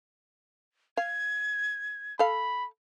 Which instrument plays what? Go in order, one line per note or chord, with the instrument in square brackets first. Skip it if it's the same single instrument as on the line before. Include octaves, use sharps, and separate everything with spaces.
[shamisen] F5 [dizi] G#6
[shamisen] A4 F5 [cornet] B5